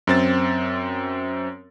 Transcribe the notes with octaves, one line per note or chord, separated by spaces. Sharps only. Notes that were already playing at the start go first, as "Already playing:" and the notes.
F#2 C4 A6